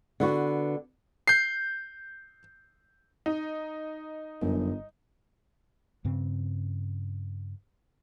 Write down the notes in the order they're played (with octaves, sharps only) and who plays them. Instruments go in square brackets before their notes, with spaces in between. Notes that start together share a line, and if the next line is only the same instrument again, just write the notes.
[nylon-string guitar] D3 B3 F#4
[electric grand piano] G6 C7
[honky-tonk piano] D#4
[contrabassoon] G1 [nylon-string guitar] F#2
[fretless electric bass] G2 C#3 C4